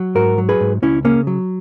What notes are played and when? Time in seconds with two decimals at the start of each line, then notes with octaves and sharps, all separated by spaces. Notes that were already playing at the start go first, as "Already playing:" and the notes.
Already playing: F#3
0.15 G#2 F#4 A#4
0.38 F#3
0.49 G#4 B4
0.61 G#2
0.82 C#2 C#4 E4
1.05 C#3 A#3 C#4
1.27 F#3